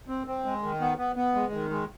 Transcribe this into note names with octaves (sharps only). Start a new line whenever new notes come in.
C4
C4
G#3
D#3
B3
B3
B3
G#3
D#3
G#3